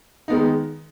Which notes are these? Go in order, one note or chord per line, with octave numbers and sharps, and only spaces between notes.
D#3 G#3 B3 D#4